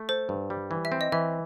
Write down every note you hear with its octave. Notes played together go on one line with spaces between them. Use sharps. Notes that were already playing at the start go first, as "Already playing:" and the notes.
Already playing: A3
A4 C5
G2
G3
E3
E5
C4
D#5
E3 E5